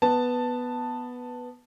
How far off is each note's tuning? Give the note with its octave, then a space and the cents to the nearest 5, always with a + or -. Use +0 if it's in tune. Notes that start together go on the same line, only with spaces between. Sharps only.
B3 +0 A5 +5